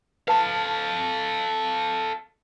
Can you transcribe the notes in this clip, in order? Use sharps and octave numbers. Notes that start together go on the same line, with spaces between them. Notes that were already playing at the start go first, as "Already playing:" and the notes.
A4 B4 F5 A5